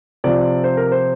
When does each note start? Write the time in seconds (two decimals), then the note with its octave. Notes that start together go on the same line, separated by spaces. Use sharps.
0.24 C3 F3 D5
0.64 C5
0.77 A#4
0.92 C5